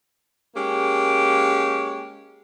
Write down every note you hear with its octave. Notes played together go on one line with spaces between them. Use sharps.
G#3 A#3 C#4 G4